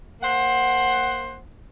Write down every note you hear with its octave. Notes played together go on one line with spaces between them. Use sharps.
A#3 C5 F#5